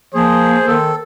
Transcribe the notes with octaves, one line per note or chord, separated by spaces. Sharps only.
F3 A#3 G#4 C5
D#3 A4